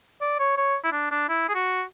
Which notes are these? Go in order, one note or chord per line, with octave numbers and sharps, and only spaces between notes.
D5
C#5
C#5
E4
D4
D4
E4
G#4
F#4